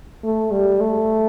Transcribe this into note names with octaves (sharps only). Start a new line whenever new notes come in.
A3
G3
A3